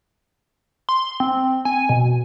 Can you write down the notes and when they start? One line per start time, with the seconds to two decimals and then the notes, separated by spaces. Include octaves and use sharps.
0.89 C6
1.20 C4
1.65 G#5
1.89 B2